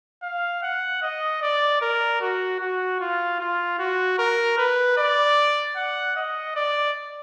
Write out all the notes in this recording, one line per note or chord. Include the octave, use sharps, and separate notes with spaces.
F5
F#5
D#5
D5
A#4
F#4
F#4
F4
F4
F#4
A#4
B4
D5
F#5
D#5
D5